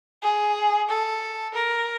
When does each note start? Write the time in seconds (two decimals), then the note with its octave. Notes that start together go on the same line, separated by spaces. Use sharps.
0.23 G#4
0.89 A4
1.54 A#4